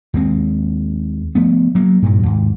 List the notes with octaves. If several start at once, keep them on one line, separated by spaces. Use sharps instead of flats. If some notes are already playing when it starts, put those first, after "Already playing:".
D#2 G#3 C4
F3 A3 B3
F#3 A#3
G2 A#2 F#3
D#2 G#2